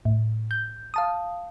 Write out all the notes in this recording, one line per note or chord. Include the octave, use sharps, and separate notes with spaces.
A2
G6
F5 A5 D#6